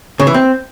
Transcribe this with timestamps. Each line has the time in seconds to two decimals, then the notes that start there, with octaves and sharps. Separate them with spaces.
0.20 C#3
0.27 E3
0.34 C4